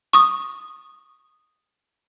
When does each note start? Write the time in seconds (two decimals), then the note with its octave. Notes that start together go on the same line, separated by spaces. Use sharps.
0.13 C#6 D#6